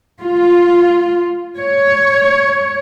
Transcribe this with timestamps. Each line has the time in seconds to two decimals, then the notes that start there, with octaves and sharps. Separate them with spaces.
0.22 F4
1.57 C#5